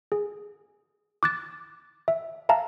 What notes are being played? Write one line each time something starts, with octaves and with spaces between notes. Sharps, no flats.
G#4
D6 F#6 A6
E5
E5 F5 A5 A#5